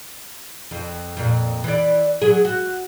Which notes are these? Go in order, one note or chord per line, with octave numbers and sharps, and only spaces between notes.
F2
F2 A#2
E3 D5
F#3 G#4
F#4